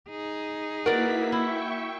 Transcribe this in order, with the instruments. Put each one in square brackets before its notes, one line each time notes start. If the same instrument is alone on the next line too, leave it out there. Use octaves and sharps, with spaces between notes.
[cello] D#4 G#4
[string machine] A#3 E4 B6 [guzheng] F#4 D5 [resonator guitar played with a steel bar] A#4 B4
[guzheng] E4 [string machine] E5 G5 C#6